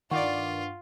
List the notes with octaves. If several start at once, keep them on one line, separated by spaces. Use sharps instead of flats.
G2 D#3 F4 D5 F#5 C#6